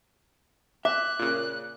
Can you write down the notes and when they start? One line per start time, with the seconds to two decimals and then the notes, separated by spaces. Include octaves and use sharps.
0.85 E5 D6 F#6
1.19 A#2 C#3